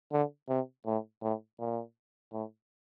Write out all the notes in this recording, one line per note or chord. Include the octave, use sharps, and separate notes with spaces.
D3
C3
A2
A2
A#2
A2